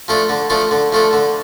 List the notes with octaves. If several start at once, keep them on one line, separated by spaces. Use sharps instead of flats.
F3 A3 D4 A4
D3
F3 A3 D4 A4
D3
F3 A3 D4 A4
D3